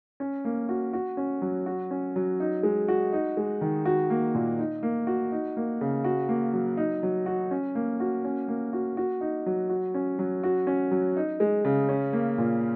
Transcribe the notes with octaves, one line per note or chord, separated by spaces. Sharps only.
C#4
A#3
F#4
F#4
C#4
F#3
F#4
C#4
F#3
D#4
G#3
F#4
D#4
G#3
D#3
F#4
A#3
A#2
D#4
A#3
F#4
D#4
A#3
C#3
F#4
A#3
F#3
D#4
F#3
F#4
C#4
A#3
F#4
C#4
A#3
F#4
F#4
D#4
F#3
F#4
C#4
F#3
F#4
C#4
F#3
D#4
G#3
C#3
C#4
A#3
A#2